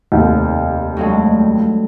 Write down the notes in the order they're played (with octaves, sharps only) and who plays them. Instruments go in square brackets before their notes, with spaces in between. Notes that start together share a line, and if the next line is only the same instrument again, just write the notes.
[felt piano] F1 D#2
[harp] G2 F#3 G#3 [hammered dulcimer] A3